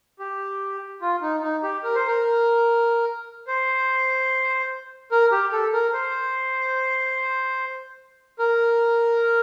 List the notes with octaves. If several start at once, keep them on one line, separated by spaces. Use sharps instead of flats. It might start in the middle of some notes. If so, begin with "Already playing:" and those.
G4
F4
D#4
D#4
G4
A#4
C5
A#4
C5
A#4
G4
A4
A#4
C5
A#4